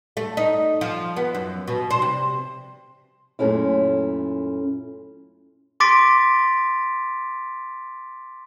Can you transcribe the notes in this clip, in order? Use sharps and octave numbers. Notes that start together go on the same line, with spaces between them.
A3
D#4
F3
B3
F#2
B2
C5
C3
F#2 A#2 A3 C#4 E4
C6 D6 A6 B6 D7